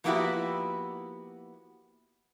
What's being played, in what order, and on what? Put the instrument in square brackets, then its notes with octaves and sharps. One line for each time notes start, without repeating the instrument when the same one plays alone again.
[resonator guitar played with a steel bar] F3 A#3 B3 E4 F#4 G4